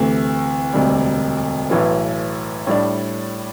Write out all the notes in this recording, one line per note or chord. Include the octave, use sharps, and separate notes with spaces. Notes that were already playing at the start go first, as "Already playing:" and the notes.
Already playing: D2 C3 E3 A3
E1 D2 C3 G3
B1 A2 E3 B3
A2 G3 D4